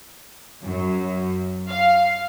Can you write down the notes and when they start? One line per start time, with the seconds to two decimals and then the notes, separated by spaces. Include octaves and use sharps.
0.62 F#2
1.68 F5